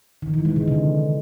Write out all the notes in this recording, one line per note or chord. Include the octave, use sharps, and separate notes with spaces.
D#3
E3
G#3
C3
D3